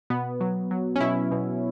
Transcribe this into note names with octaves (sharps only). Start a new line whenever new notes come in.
B2 B3
F#3
F#3
C#4
B2 E4
B2